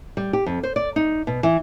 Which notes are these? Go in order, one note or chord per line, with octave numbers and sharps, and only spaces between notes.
G3
G4
F2
C5
D5
D#4
B2
E3